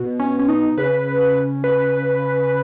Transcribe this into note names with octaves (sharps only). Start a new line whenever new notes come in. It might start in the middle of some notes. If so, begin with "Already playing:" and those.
Already playing: B2
C#4
C#4
D#4
C#3 B4
B4